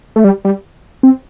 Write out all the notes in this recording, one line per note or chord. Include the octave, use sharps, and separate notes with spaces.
A3
G3
G3
C4